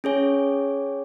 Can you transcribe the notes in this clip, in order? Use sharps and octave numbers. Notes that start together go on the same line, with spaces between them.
C#4 G#4 C#5 G#5